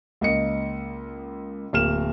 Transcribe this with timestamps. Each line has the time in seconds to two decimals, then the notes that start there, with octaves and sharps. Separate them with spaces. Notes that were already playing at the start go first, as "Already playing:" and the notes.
0.21 C#2 A#3 D#5 C#7
1.73 D1 A#3 F6 E7